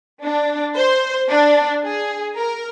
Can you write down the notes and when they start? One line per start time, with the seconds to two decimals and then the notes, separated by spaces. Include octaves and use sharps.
0.23 D4
0.76 C5
1.30 D4
1.84 G#4
2.37 A#4